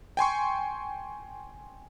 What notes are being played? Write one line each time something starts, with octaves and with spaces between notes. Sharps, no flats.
G5 G#5 C6 C#6